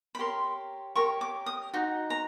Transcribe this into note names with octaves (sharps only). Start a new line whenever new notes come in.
B5
G4 A#4 C#5 C6
G4 A#4 C#5 C#6
D6
D#6
D#4 F#4
A#5